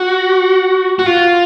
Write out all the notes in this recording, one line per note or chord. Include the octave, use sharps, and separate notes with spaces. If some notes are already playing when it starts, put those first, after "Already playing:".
Already playing: F#4
F#4
F4